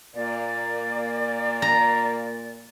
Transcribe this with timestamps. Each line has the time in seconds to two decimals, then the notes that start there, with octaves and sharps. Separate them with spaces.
0.14 A#2 A#3 D5
1.62 A#5